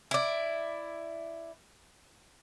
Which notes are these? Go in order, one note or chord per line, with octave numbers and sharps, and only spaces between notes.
E4 D5